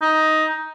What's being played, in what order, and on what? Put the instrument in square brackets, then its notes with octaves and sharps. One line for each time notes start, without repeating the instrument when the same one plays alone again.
[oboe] D#4